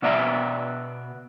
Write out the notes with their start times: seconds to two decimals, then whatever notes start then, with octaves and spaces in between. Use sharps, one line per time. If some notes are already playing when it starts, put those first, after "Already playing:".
0.02 B2 B3 D5 E5 G#5 A#5